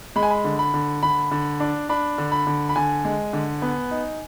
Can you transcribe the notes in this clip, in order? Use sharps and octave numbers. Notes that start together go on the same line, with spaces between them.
G#3 B5
G#5
B5
D3
B5
D3
D3 B5
D3
D4
D4 B5
D3
B5
D3
B5
D3 G#5
G#3
D3
B3
D#4